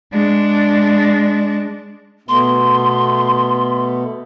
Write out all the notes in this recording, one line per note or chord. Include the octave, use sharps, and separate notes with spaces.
G#3 D4
B2 A3 B3 C6